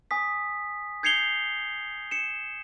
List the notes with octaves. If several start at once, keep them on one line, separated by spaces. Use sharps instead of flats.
G#5 D#6 B6
G6 G#6 C7 C#7 F7 G7
C#7 E7